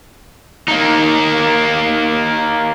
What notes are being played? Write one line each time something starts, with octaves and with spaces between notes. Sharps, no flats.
A#3 D#4